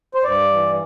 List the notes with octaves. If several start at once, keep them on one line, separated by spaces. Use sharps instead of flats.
C5
G2 D5
E3